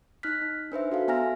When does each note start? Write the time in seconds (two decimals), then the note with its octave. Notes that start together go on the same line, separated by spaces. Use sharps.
0.23 D#4 F6 F#6 B6
0.42 D#4
0.72 D4 B4 C5 E5
0.92 F#4 A4 F5
1.08 B3 E5 G#5 A#5 F6 A#6